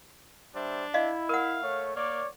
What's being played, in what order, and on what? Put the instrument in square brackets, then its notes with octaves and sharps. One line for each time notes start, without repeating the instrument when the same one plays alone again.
[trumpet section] G3 C5 E5 [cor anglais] D4
[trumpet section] E4 [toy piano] D#5 F5
[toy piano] A#4 F#5 [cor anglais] F5
[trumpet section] A3 C#5
[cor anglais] A#3 [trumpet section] C#5 D5